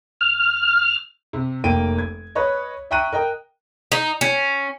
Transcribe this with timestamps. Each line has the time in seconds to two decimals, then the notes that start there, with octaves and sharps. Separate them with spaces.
0.21 F6
1.33 C3
1.64 F1 A#3 G5 D7 D#7
1.98 G#6
2.35 B4 C#5 D#5
2.91 E5 G5 A#5 C#6 F#6 D#7
3.13 A#4 D#5 G5
3.92 D#4
4.21 C#4